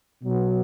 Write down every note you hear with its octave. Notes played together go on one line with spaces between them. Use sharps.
B2 F#3 B3